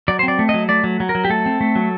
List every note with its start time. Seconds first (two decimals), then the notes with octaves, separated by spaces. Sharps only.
0.08 F#3 D5
0.19 C5
0.23 C4
0.28 D5
0.39 A3
0.49 D#5
0.54 F#3
0.69 A3 D5
0.84 F#3
1.00 F#3
1.09 A#4
1.15 F#3
1.25 G4
1.30 A3 A4
1.46 C4
1.61 A3
1.75 F#3